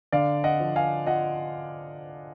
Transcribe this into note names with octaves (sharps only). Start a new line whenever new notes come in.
D3 D5 F5
D#5 F#5
F3
F5 G#5
F4 D#5 F#5